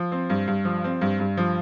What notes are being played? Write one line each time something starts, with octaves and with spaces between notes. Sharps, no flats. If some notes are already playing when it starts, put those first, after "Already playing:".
Already playing: F3
C4
G2
G2
F3
C4
G2
G2
F3